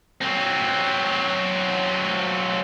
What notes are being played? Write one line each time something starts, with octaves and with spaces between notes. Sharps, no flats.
F#3 C4